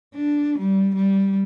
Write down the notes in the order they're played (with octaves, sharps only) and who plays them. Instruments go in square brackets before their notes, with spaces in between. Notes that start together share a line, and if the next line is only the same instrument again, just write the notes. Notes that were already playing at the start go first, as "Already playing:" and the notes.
[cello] D4
G3
G3